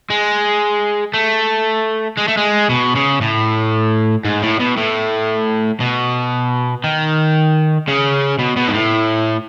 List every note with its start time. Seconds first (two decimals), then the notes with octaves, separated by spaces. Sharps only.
0.10 G#3
1.13 A3
2.17 G#3
2.28 A3
2.37 G#3
2.69 B2
2.95 C#3
3.21 A2
4.25 G#2
4.42 A2
4.59 B2
4.77 A2
5.80 B2
6.84 D#3
7.88 C#3
8.39 B2
8.57 B2
8.68 G#2
8.74 A2